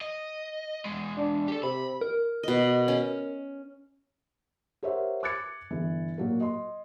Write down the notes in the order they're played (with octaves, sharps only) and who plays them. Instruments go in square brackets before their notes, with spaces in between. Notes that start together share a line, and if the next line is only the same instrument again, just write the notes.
[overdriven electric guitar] D#5
E2 G#3
[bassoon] D4
[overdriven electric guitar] G4 A4
[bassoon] C3 [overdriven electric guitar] B5
[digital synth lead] A#4
[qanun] B2 D#5
C#4
[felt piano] G4 A#4 C5 C#5 E5 F#5
D6 F#6 G#6 A6 C#7
G1 E3
A#2 F#3 A#3
D#5 C6